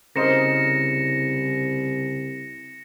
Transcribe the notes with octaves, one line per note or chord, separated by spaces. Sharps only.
C2 C#3 A#4 C5 D#5 A#6 C#7 E7